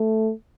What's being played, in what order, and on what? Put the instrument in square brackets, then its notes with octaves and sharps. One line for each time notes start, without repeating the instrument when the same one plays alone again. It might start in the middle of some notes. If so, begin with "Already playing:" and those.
Already playing: [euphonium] A3